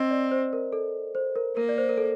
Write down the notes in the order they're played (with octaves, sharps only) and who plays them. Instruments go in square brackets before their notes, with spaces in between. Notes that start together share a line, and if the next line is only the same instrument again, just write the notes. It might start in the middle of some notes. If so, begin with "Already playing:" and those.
Already playing: [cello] C4 [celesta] D#5
[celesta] D5
C5
A#4
A4
C5
A#4
[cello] A#3 [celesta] A#4
[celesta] D5
C5
A#4
A4